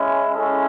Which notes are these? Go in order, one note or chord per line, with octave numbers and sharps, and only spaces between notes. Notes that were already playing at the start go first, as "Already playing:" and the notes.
Already playing: G#3 C#4 E4
G#3 C#4 E4 A4